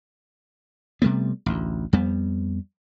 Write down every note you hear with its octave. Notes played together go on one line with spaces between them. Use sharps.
C3 G3 A3 B3
A1 D2
F2 G3 B3